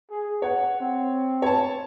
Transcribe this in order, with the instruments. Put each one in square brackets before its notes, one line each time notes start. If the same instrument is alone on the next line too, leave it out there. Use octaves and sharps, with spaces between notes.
[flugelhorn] G#4
[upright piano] C#5 [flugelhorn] F#5
[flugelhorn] C4
[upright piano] C#5 A5